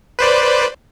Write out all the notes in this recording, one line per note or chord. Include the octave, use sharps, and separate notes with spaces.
B4 C5 D5